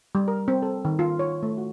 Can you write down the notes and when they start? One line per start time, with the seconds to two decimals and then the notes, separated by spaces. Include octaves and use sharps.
0.15 G3
0.28 A#4
0.48 C4
0.62 A4
0.85 D#3
0.99 F4
1.19 C#5
1.43 A3
1.58 F#4